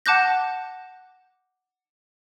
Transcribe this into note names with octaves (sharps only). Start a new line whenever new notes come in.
F#5 A5 D6 F#6 G6 A#6